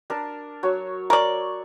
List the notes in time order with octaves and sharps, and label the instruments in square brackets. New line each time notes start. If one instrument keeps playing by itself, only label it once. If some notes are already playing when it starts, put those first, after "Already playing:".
[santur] D4 A#4 A5
F#3 C#5
[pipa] A#4 D5 [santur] C#6